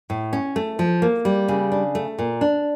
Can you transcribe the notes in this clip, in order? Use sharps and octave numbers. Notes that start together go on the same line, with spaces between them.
A2
C#4
A3
F3
A#3
G3
C#3
D4
A3
A#2
D4